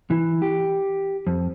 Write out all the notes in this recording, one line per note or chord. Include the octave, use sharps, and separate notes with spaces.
E3
G4
F2